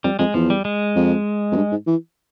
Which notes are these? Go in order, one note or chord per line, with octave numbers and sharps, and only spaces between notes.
F2 G3
F2 G#3
E2 F3
G3
G#3
F2
F2
G2
G#2
E3